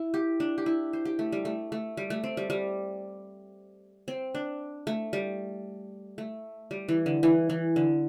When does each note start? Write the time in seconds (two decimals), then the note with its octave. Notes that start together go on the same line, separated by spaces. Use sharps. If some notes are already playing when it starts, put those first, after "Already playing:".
Already playing: E4
0.14 G4
0.40 D4
0.58 G4
0.66 E4
0.93 C5
1.05 G4
1.19 A3
1.32 G3
1.45 A3
1.72 A3
1.97 G3
2.10 A3
2.24 C4
2.37 G3
2.50 G3
4.08 C4
4.35 D4
4.87 A3
5.13 G3
6.18 A3
6.71 G3
6.89 E3
7.06 D3
7.23 E3
7.50 E3
7.76 D3